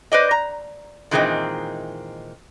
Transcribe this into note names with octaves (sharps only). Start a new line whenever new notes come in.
B4 C5 D5 D#5
A#5
A#2 D#3 E3 G#3 A3 C4